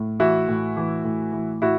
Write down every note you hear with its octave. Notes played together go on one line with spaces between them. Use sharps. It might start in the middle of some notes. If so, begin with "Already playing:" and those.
Already playing: A2
E3 E4 F#4
A2
E3
A2
E3
A2 E4 F#4